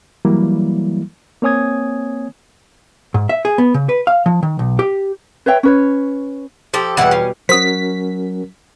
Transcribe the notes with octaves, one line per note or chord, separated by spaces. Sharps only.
E3 F#3 G3 A#3 E4
A#3 C4 C#5 G#5 D#6 G#6
G#2
E5
G#4
B3
C#3
B4
F5
F3
D#3
B1
G4
B4 C#5 E5 G5
C#4 B4 C#5
F3 G4 A4
E2 B2 G3 E4 F#5
C#4 G4 F5
F#3 C#4 F#4 A#4 C5 D#6 B6